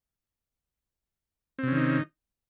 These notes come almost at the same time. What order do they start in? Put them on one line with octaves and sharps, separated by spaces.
C4 C3 C#4 D#3 D#4